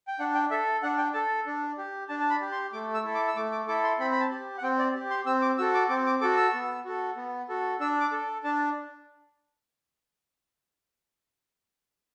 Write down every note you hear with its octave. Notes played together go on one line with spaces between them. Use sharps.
G5
D4 F#5
G5
A4 E5
D4 F#5
G5
A4 A5
D4
G4
D4 A5
A5
B5
G4
C6
A3 D6
E6
E4 A4
D6
E6
A3 D6
D6
E4 A4 D6
C6
C4 B5
B5
A5
G4
F#5
C4 G5
D5
G4
C6
C4 E6
D6
F#4 A4 E6
D6
C4 D6
D6
F#4 A4 D6
E6
B3
F#4 A4
B3
F#4 A4
D4 E6
D6
A4
D4 A5